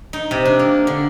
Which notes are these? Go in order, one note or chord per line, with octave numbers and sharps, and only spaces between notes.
D#4
C3
D4
A#3
D3